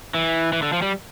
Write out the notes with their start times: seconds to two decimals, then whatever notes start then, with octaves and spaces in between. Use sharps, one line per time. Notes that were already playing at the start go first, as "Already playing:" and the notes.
0.14 E3
0.53 E3
0.63 D3
0.73 F3
0.82 G3